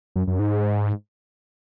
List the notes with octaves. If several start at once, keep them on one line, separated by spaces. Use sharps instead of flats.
F#2
F#2
G#2